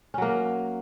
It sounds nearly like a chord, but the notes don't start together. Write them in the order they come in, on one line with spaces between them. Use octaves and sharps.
C#4 F#3 A#3